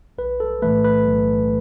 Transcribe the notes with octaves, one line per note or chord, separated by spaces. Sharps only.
B1 B4
A4
A2 E3 A3 B4
B4
B1